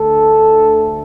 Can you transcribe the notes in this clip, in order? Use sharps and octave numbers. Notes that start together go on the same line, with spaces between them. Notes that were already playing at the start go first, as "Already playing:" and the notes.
Already playing: D2 D3 A3 A4